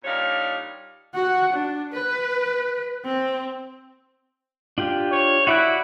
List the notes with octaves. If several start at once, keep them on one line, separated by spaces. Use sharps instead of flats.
A#2 G3 D4 D#4 C#5 F5
F#4 F#5
D4
B4
C4
D4 F4 G4
C#5
E4 F#4 D5 F#6